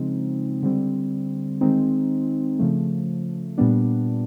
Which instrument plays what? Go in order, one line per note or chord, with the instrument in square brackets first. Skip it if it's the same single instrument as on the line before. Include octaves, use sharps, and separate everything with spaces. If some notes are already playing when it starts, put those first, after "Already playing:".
Already playing: [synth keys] C#3 F3 G#3 C4 D#4
D3 G3 C4
D#3 G#3 C4 D#4
C#3 F3 A3
A#2 G3 B3 D4